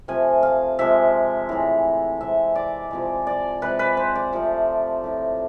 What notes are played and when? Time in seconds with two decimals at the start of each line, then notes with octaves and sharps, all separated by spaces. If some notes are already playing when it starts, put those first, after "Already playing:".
0.08 C3 F3 A3 G#5
0.43 F5
0.79 C3 F3 G#3 E5
1.49 A2 E3 G#3
2.21 C3 G#3 E5
2.56 D5
2.91 C3 F3 G#3
3.27 D5
3.62 C3 G#3 B4
3.79 B4
3.97 C5
4.16 D5
4.33 C3 F3 A3
5.04 A2 F3 A3